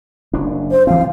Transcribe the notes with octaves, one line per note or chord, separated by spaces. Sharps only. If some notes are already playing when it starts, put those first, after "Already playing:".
F#1 F#2 D4
C5
E3 C4 F5